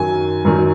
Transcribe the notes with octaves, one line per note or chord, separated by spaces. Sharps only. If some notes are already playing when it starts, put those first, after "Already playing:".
Already playing: F#2 D#3 F#3 G#5
F#2 D#3 F#3